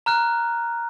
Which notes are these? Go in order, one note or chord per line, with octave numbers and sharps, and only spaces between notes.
A#5 F6 F#6